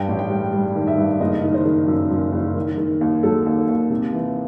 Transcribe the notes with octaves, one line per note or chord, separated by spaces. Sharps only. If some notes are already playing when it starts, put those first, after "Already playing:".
Already playing: G2 G5
A1
G5
G3
G3
D#3
E5
G2
F#1 D#5
D#3
C5
D#3
F#2
F#2
F#1
D#3
D#3
D#2
F#3 A4
D#2
D#2
C3
E3